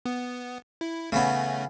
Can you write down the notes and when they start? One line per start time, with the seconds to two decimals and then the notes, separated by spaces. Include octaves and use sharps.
0.06 B3
0.81 E4
1.12 C#3 E3 A3 B3 C#4